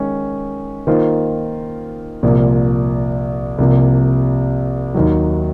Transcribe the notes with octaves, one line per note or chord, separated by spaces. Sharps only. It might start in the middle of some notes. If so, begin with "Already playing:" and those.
Already playing: D#3 G#3 C#4
D#3 A#3 F4 C5
C2 A#2 F3 A#3
C2 C3 F3 A#3
D#2 D#3 F#3